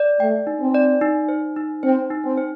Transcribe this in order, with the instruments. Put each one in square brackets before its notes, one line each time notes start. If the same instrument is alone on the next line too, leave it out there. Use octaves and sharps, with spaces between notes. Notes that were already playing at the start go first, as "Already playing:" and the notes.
Already playing: [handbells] D5
[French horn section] A3 [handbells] G5
[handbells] D#4
[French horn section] C4
[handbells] D5
D#4
C5
D#4
[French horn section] C4 [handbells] C5
[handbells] D#4
[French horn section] C4
[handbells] C5